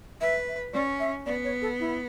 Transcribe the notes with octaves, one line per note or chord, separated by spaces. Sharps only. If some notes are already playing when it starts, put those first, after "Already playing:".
B4 E5
E5
C#4 D5
E5
B3 D5
C#5
A4
E4